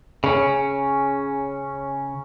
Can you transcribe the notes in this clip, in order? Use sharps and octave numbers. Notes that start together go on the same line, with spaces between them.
C#3 C#4